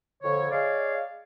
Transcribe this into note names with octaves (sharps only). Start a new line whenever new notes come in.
F2 D3 C#5
G#3 C#5 D5 F5